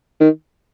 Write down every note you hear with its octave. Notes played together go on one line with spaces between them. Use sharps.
D#3